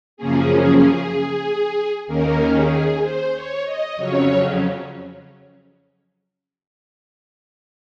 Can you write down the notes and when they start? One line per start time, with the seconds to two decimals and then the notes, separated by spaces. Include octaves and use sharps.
0.17 F#2 C#3 F3 A#3 C#4 G#4
2.07 D#2 D#3 A#3 C#4 A#4
2.55 G#4
3.02 C5
3.34 C#5
3.65 D#5
3.96 F2 C#3 F#3 C#4 C#5